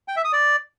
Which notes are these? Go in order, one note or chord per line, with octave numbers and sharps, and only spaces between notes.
G5
E5
D#6
D5